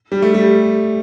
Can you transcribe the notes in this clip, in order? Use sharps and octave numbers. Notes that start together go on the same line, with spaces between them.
G3
A3
G3